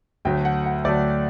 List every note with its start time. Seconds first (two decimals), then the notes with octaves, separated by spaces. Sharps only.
0.25 D2 D3 F#3 A3 G5
0.45 F#5
0.66 F#5
0.85 D2 D3 F#3 A3 D5